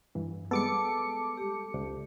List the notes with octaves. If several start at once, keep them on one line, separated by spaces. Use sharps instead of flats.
G2 E3
G3 G#3 B3 A4 D6 C#7
G4
C#2